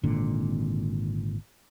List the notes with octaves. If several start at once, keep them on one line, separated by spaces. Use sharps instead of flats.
G#1 A#2 D3